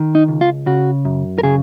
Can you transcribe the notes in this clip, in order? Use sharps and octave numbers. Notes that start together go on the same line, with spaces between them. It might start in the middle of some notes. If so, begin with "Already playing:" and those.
Already playing: D#3
D#4
C#2
F4
C#3 F#4
F#2
A#4
C#3 G#4